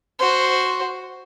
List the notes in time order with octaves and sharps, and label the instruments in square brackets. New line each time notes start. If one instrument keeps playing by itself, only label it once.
[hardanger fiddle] F#4 C5